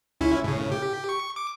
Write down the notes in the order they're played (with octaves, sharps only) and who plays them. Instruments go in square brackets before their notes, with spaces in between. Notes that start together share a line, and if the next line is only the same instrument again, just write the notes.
[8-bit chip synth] C#2 C#4 E4
A2 C#3
G4
C#6
D6